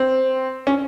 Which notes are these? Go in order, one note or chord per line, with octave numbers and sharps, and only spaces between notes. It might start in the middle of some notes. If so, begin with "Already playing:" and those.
Already playing: C4
C#4